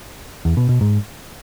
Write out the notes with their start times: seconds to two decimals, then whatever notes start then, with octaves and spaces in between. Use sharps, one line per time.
0.45 E2
0.57 B2
0.69 B2
0.81 G#2